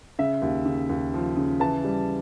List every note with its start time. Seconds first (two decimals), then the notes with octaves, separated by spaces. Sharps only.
0.19 C#3 E5
0.42 D#2
0.66 C#3
0.89 D#2
1.14 F3
1.36 C#3
1.60 E3 A5
1.84 G3